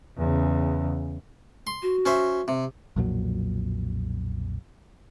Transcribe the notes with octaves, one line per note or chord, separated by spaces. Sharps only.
E2 C#3
C6
F#4
C#4 C5 E5
C3
B1 F2 A#2 F#3